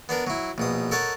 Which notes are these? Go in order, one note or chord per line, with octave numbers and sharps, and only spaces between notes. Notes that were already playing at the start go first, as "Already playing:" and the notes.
B3 D4 A#4
F#3 E4
A#1 B2 D#6
A4 A#4 C#5 D#5 F#5 A5